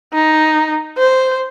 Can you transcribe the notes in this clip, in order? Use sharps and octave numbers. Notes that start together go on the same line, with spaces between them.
D#4
C5